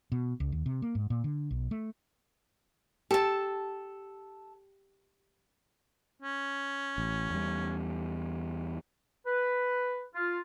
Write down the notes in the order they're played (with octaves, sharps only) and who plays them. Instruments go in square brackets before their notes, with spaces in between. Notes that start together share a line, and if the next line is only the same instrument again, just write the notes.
[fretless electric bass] B2
C#2
D#2
C3
A#3
G#2
A#2
D3
B1
A3
[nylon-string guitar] G4 [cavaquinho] A4 A5
[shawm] C#4
[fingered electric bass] A1
E2 G3
[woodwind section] B4
F4